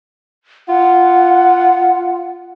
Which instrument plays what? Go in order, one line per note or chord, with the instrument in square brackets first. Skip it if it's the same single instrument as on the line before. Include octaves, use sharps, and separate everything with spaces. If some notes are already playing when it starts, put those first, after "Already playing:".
[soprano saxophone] F4 [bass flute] F#5